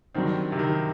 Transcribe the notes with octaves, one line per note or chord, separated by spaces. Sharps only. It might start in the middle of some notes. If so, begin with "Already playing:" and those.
G2 D#3 F#3 C4
C3
D#3